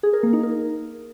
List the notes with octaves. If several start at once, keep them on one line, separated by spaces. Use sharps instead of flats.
G#4
A#4
A#3
D#4
A#4